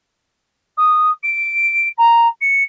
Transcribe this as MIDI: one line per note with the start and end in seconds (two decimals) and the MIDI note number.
0.77 1.10 87
1.23 1.88 98
1.97 2.27 82
2.41 2.63 97